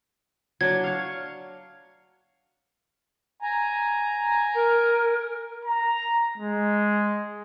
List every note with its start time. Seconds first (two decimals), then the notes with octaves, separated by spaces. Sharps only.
0.61 F#3 D4 G#6
0.84 F5 C#6
3.42 G#5 A#5
4.55 A#4
5.65 A#5
6.38 G#3